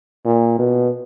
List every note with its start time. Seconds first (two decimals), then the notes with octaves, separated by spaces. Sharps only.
0.25 A#2
0.59 B2